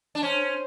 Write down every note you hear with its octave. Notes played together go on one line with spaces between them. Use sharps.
D4
C#4 C5